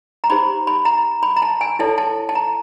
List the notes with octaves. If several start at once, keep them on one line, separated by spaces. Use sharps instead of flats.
A#5
D#4 G4 C5 B5
B5
A#5
B5
A#5
A5
G#5
E4 A4 C#5 A5
A5
A5
A#5